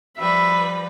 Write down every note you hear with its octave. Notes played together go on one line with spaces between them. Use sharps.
F3 G3 B4 E5